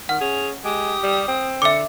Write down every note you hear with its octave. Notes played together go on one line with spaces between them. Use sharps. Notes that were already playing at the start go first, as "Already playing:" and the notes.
D#3 F#5 F6
C#4 G#4 F7
G#3 G4 D#6
G3
C4
D3 E5 D6 C#7